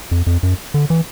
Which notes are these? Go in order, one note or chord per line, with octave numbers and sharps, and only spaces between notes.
F2
F2
F#2
D3
E3